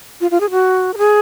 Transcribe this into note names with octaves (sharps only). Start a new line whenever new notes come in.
F4
F4
G#4
F#4
A#4
G#4